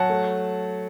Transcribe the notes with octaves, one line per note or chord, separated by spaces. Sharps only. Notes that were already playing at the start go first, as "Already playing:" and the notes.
Already playing: F#3 F#5 A5
A3